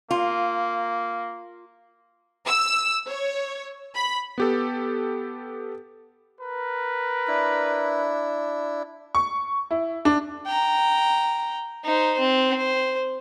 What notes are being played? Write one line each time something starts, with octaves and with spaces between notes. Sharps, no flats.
A#3 F4
E6
C#5
B5
B3 G4 A4
A#4 B4
D4 E4
C#6
E4
D4
G5 A#5
D#4 C5
C4
C5